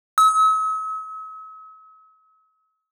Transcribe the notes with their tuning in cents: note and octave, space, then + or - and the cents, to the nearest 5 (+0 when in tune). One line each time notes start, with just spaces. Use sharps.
E6 -45